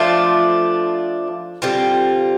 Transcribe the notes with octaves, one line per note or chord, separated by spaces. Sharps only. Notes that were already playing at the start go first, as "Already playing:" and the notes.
Already playing: F3 A3 D4 F4
D3 G3 C4 F4